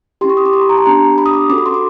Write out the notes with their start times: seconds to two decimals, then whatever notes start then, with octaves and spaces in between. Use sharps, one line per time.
0.21 C#4 E4 G4 C6
0.29 C#6
0.37 D#6
0.45 D6
0.53 C6
0.61 B5
0.69 A#5
0.77 A5
0.86 B3 D4 G4 A#5
1.18 B5
1.26 D#6
1.33 D6
1.50 C#4 F#4 A4 D6
1.58 B5
1.66 C6
1.74 D6